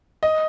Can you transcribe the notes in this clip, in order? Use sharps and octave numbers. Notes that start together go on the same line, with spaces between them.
D#5